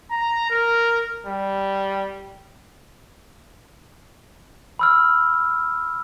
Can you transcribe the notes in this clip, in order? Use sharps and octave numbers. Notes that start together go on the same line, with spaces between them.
A#5
A#4
G3
B5 E6 F6